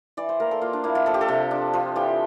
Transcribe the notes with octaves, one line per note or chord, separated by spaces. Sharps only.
E3 D5
C5
A#3 A#4
A4
A#3 F4
D4
A#3 E4
F4
F3 A4
G4
A4
C3
D4
F3
E3 G4